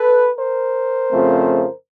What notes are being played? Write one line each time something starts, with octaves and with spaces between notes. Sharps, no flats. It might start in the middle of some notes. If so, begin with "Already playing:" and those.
Already playing: A4 B4
A#4 C5
F2 C#3 F3 A3 C4